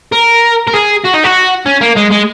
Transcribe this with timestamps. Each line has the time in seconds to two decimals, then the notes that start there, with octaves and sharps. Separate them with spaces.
0.12 A#4
0.67 A#4
0.74 G#4
1.05 F#4
1.14 D#4
1.24 F#4
1.66 C#4
1.81 A#3
1.97 G#3
2.11 G#3